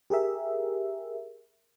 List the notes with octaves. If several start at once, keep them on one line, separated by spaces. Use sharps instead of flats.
G4 G#4 A#4 E5